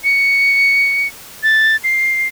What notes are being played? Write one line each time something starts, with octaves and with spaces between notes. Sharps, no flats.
C#7
A6
C7